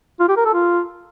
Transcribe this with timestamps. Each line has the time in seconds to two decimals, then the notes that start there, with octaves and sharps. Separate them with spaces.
0.20 F4
0.28 G4
0.37 A#4
0.45 A4
0.54 F4